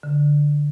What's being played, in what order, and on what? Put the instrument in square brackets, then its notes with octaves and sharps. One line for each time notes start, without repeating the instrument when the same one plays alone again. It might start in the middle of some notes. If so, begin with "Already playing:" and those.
[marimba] D3